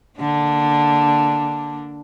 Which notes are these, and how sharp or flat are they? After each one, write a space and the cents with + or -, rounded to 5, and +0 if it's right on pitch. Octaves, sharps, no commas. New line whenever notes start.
D3 +0 A#3 -5 D4 +0